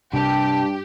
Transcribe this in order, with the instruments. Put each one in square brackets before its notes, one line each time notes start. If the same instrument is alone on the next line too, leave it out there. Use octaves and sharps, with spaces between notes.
[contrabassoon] G2 [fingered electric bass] C3 G3 [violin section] G4 [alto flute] A5